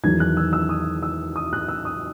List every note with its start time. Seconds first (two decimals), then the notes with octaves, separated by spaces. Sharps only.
0.04 E2 D#3 F#3 G#6
0.20 F#6
0.37 E6
0.53 E6
0.69 D#6
1.02 E6
1.36 D#6
1.53 F#6
1.68 E6
1.85 D#6